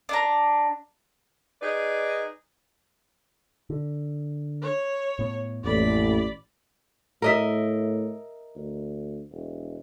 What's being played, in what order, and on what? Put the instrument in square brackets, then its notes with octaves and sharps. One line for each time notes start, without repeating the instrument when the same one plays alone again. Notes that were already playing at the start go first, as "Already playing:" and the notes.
[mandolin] D4 A#5
[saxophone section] D#4 G#4 B4 D5
[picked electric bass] D3
[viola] C#5
[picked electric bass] A2 B3
[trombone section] A1 [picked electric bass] F2 A#3 [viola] D5 B5
[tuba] A2 [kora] A#4 D#5 E5
[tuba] D2
E1